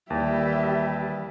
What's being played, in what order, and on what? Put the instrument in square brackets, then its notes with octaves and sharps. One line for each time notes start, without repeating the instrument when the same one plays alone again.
[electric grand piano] D#2 [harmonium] E3 G3 [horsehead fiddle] G4 E5